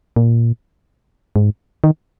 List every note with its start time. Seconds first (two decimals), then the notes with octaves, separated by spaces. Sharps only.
0.16 A#2
1.36 G#2
1.84 D#3